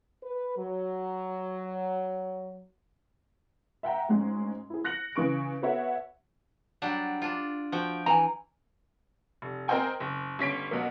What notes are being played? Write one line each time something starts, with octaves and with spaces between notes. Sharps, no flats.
B4
F#3
E5 F#5 G5 A#5
D2 G#2 G#3 C#4
E4 G#4
F#6 A#6 C#7 F#7
C#3 E3 C#6 D7
B3 F#4 A4 C#5 E5 F#5
F#3 G3 D4
D4 F4
F3 F#4 G5
E3 G#5 A#5
F1
C4 A#4 C5 D#5 G5 G#5
F#1
G1 C#4 B6 D7
B2 F#3 A#3